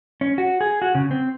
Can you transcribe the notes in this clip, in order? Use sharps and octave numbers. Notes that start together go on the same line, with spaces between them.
C#4
F#4
G#4
F#4
C#3
C4